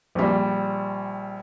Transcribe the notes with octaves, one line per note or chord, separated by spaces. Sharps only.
A#1 G3